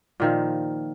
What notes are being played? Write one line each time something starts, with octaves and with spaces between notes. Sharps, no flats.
A#2 D#3 F3